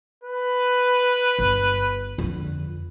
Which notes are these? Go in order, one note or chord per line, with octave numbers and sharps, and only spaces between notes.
B4
G1
F2 D3